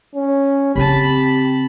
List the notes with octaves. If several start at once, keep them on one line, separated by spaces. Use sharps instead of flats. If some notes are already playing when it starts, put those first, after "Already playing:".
C#4
C#3 C4 G4 A5 B5